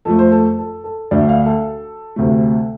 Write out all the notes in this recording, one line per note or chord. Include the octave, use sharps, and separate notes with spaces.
F2 F3 A3 A4
C5
A4
A4
A4
D2 D3 A3 D5
F5
A4
D2 C3 A3